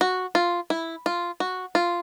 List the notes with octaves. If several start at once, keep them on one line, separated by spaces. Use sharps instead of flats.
F#4
F4
E4
F4
F#4
F4